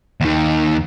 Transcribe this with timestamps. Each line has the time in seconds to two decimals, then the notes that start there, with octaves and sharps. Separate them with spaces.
0.21 D#2 D#3